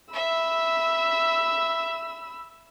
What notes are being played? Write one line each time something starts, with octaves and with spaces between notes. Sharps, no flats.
E5 B5 E6